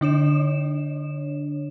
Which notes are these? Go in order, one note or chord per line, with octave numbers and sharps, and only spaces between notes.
D3 D4 C#5 E7